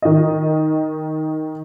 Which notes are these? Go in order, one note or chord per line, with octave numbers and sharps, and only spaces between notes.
D#3 D#5